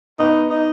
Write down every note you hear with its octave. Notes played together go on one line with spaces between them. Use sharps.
B3 D#4
D#4